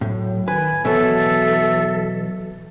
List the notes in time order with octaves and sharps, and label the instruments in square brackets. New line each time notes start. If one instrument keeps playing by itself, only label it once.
[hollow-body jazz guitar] A2 [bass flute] F#3
[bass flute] D#3 [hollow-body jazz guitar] B4 [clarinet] G#5
[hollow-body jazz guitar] B2 F#3 [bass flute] E3 [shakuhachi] A4 [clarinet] E5